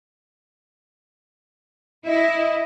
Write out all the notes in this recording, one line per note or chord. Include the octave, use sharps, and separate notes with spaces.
E4 D#5